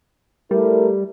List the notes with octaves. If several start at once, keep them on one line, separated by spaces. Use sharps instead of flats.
G3 A3 E4 A#4